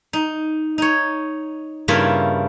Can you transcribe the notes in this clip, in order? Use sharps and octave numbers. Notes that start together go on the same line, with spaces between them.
D#4
D#4 C#5
G2 C#3 A#3 E4 F4 E5